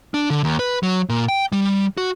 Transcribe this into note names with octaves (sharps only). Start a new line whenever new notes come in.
D4
D3
D#2
B4
F#3
A#2
G5
G3
F#4